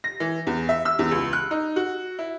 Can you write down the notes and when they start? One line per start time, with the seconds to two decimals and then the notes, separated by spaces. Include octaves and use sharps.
0.04 A#6
0.20 E3
0.47 E2
0.69 E5
0.85 E6
0.99 E2
1.11 C#2
1.33 F#6
1.51 D#4
1.76 F#4
2.19 E4